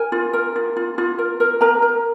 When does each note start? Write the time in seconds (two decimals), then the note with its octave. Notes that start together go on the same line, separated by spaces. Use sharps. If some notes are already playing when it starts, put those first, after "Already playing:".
Already playing: A#4 G#5
0.12 F4
0.33 A#4
0.56 F4
0.77 F4
0.98 F4
1.19 A#4
1.40 A#4
1.61 A#4 A#5
1.82 A#4